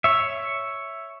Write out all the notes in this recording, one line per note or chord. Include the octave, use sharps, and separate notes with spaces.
C#5 E5